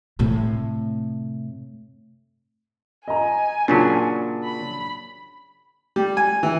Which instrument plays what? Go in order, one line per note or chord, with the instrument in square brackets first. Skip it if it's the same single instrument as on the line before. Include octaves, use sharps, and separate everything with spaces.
[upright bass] A2 C3
[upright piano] D#5 A#5 [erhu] G#5
[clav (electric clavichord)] A#2 C#3 F#3 [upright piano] D4 A5
[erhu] B5
[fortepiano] G3
G#5
E3